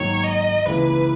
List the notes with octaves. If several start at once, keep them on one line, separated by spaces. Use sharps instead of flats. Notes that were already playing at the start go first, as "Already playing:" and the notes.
Already playing: G#2 D#3 F#3 A#3 C#5
D#5
C#2 C#3 E3 A#3 E4 B4